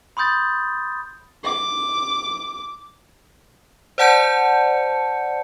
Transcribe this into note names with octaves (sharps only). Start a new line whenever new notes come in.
B5 C6 D#6 G6 A6
D6
C5 D5 F#5 A5 G6 C#7